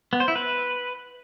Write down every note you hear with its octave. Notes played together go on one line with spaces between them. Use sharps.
B3
C5
E4
B4